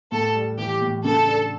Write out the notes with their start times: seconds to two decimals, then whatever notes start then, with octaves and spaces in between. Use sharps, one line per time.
0.12 A2 A4
0.35 G3
0.58 E3 G4
0.82 A2
1.05 C#3 A4
1.28 D4